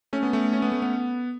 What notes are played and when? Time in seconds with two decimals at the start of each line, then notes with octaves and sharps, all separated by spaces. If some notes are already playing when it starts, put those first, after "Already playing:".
0.13 A3 C#4
0.23 B3
0.33 A3
0.53 C#4
0.62 B3
0.72 A3
0.82 B3